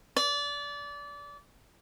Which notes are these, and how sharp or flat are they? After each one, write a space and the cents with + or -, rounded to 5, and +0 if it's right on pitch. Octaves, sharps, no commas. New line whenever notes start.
D5 -25